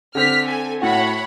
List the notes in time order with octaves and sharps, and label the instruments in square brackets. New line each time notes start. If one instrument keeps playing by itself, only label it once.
[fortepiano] D3 C4 [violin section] F6 B6
[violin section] A4 G#5
[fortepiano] A2 F#4 [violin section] C#5 F#5 B5